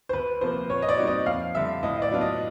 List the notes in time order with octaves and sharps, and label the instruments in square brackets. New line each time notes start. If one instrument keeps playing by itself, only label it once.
[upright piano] C5
[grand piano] D2 [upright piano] B4
[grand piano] C3 F3 A#3 [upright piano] C5
[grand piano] A#2 [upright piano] C#5
[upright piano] D#5
D5
[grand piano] G3 C4 D#4 F#4
[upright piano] D#5
[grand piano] F2 [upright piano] F5
[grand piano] D3 G3 [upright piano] E5
[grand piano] A2 [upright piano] D#5
[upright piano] D#5
D5
[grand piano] F#3 B3 D4 F4
[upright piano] D#5